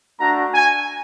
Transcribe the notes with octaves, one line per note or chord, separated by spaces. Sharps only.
A3 D4 F#4 A#5
G#5